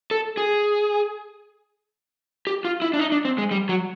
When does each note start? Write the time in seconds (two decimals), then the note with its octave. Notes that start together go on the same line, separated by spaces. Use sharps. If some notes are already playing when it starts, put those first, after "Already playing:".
0.11 A4
0.37 G#4
2.47 G4
2.65 F4
2.82 E4
2.94 D4
2.99 D#4
3.12 D4
3.25 C4
3.38 G#3
3.51 G3
3.69 F#3